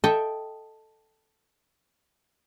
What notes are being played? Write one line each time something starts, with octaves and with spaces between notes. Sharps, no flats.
A4 D#5 E5 G5